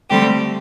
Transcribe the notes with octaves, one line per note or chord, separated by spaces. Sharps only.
D3 G3 A3 C4 G4